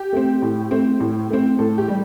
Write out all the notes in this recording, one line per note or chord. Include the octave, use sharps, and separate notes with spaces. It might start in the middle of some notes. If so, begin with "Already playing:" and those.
Already playing: G4
A3 C4
A2
A3 C4
A2
A3 C4
A2 A4
G4
G3